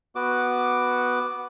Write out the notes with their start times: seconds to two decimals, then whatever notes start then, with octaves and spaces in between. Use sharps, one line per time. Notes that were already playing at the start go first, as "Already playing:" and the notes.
0.16 B3 F#4 D6